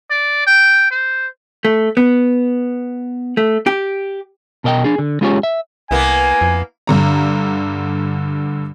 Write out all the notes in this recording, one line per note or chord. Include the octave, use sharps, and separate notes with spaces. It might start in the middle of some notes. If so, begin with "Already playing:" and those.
D5
G5
C5
A3
B3
A3
G4
B2 A#4 D#5 E5 G5
D4 G#4
D3
G#3 C#4 F4 G4 G#4 C#5
E5
C2 A#3 B3 E4 G#5
F2
G2 D3 A#5